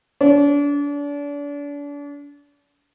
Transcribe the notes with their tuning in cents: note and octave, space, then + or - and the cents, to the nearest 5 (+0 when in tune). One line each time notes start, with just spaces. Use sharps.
D4 -35